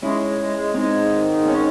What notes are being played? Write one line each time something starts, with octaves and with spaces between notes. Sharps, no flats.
G#3 C#4 E4
G#3
G#3
G#3
G#3 C4 D#4
G#2
D#3
G#2
C4 C#4 D#4